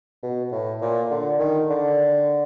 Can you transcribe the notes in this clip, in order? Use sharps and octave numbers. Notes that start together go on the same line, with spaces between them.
B2
A2
A#2
D3
D#3
D3